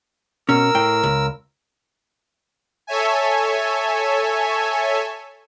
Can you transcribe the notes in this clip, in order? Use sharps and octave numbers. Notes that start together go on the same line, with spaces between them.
B2 C#4 A#4 E6
A2 G5
C#2
A4 C#5 E5 G#5